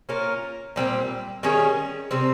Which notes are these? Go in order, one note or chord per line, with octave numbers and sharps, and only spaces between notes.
A#3 C#4 F4 A#4
A#2 G3 C4
D#3 G3 C#4 G#4
C3 G3 C4